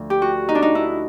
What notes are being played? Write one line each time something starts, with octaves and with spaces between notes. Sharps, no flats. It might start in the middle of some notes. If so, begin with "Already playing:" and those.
Already playing: D2 D3 F3
G4
F#4
D#4
D4
D#4
E4